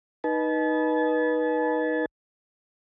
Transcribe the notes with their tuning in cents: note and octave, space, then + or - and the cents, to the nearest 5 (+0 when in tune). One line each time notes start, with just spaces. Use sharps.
D#4 +0 B4 -20 A5 -40